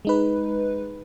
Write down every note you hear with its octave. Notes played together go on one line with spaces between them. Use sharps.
G#3 D#4 B4